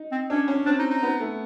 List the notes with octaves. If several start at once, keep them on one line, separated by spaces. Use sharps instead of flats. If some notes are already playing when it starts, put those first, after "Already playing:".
Already playing: D#4
C4
C#4 D4
C#4
C4 D4
D#4
D#4
B3
A3